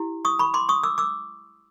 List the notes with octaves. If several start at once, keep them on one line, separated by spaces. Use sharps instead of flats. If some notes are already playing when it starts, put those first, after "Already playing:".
Already playing: E4 G4
C#6 D#6
B5 C#6
C6 D6
C#6 D#6
D6 E6
D6 E6